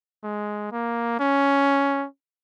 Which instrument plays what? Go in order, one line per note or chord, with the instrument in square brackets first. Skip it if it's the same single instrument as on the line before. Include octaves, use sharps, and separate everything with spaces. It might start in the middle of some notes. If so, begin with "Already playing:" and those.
[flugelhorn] G#3
A#3
C#4